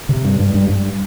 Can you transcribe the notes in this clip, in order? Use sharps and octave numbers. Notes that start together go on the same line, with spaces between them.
C3
G2
G2
G2
G2